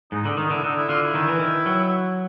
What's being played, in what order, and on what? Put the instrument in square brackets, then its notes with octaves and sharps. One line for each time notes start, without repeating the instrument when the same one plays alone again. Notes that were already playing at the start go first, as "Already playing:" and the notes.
[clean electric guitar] G#2 [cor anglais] D#4
[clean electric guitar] D3
[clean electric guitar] D#3 [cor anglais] D#4
[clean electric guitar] D3 [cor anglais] E4
[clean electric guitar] D3 [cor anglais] D#4
[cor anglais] E4
[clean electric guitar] D3 [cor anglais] F4
[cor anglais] E4
[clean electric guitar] D#3
E3
D#3
F#3